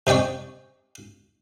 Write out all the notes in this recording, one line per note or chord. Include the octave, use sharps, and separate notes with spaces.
C3 D#4 D5 G5 C#6